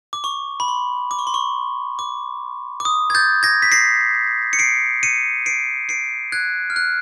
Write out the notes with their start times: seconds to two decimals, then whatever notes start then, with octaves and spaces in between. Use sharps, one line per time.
0.13 D6
0.24 C#6
0.60 B5
0.68 C6
1.11 D6
1.19 C#6
1.27 C6
1.34 C#6
1.99 D6
2.80 D6
2.85 D#6
3.10 G#6
3.15 G6 A6
3.43 G#6 A#6
3.62 B6
3.72 A#6 C7
4.53 C#7
4.59 C7 D7
5.03 C#7 D#7
5.46 C7 D7
5.89 C7 D7
6.32 F#6 G#6
6.70 F6
6.76 F#6